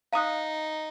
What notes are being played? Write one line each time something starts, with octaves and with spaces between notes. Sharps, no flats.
D#4 F5 A#5 D#6 F#6